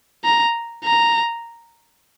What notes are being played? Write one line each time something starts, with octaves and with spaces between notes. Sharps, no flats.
A#5
A#5